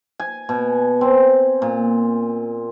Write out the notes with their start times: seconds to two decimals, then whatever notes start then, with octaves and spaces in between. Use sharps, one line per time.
0.20 G#5
0.49 B2
1.01 C4
1.62 A#2